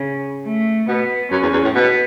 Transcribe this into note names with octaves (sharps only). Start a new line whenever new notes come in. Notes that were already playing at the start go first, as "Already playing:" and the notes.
Already playing: C#3
A3
B2 B3
F#2 C#4
E2
E2
A2
B2 B3